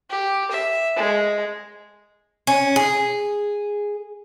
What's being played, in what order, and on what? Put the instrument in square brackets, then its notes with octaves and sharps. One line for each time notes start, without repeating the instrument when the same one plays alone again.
[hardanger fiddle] G4
E5
G#3
[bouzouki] C#4
G#4